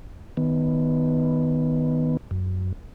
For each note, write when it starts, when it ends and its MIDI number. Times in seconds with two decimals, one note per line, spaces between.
0.37 2.17 51
0.37 2.17 59
2.31 2.72 42